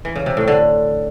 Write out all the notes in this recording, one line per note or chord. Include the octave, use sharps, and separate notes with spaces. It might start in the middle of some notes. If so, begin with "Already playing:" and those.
E3
C#3
C3
A2
D3